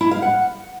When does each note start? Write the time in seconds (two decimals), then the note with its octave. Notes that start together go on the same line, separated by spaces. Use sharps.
0.01 E4
0.11 F5
0.22 F#5